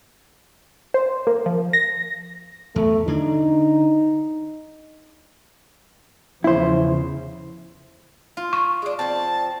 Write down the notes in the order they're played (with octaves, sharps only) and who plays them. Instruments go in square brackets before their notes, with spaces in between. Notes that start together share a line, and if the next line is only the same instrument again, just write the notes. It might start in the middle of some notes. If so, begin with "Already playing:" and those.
[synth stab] C5
A#3
F3
A#6
[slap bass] E2 [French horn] A3
[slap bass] D3 D4 [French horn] D#4
[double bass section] E2 C#3 F3 [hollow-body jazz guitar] E4 C5
[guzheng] F4
[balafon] C#6
[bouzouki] G#3 D4
[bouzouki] F3 C4 [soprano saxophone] A5